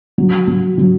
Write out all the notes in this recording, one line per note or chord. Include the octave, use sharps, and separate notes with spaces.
F#3
F#3
F#3